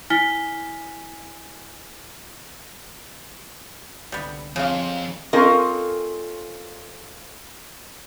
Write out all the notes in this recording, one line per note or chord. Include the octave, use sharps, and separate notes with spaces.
E4 G#5 F6 B6 G7
C2 D3 G3 B3
F2 C#3 F5
C4 C#4 F4 A4 A#4 D#5